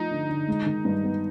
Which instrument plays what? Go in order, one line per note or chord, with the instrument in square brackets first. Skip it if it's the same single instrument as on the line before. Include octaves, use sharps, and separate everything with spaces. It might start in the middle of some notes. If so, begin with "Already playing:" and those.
Already playing: [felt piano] F3 A3 [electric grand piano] D#4
[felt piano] D3
D3
G#3
D#3
G2
B3